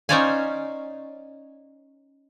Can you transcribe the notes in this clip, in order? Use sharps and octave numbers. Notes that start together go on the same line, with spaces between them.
C#4 D#4 C5 D5 F5 G#5